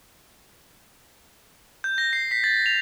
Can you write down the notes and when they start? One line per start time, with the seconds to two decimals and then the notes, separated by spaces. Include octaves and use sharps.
1.84 G6
1.98 A#6
2.13 C7
2.31 B6
2.44 A6
2.66 F7